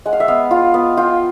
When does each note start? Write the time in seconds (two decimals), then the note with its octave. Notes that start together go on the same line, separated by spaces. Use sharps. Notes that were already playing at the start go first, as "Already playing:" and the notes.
0.05 G#3 F#5
0.13 F5
0.20 E5
0.28 B3 F5
0.51 F4
0.74 B3
0.97 F4 G5